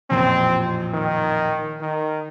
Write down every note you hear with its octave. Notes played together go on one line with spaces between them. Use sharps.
A1 F2 A#2 C4
D#3
D#3